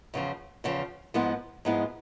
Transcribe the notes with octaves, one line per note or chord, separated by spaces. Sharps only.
E2 C#3 F3
E2 C#3 F3
G#2 F3 G#3 B3 E4
G#2 F3 G#3 B3 E4